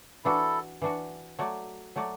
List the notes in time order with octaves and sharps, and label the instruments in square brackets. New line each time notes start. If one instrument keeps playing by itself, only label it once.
[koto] E3 D4 F#4 [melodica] E4 A4
[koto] E3 D4 F#4
F#3 A3 F#4 D5
F#3 A3 F#4 D5